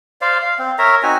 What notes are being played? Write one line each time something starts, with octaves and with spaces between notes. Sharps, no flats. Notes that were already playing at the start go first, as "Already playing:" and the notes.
C5 D5 F5
F5
C4
A#4 C#5 E5 A#5
C4 D#4 F#4 G#5